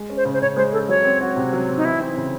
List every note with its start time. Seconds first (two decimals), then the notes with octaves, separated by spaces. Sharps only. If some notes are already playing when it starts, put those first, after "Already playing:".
Already playing: G#3
0.10 C#4
0.17 C5
0.25 C#3
0.33 C5
0.42 C#3 C#5
0.56 G#3 C5
0.72 C#4 A4
0.89 F#3 C#5
1.04 C4
1.21 F#4
1.36 C3
1.53 F#3
1.68 C4
1.77 D#4
1.85 E3 E4
2.00 C4
2.17 C#3